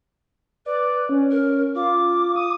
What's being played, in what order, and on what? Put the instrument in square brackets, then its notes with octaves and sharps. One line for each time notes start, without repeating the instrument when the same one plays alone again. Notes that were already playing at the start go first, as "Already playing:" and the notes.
[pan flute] B4 [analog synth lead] D5
[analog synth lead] C#4
[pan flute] A#4
[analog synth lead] F4 [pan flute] D6
[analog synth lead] D#6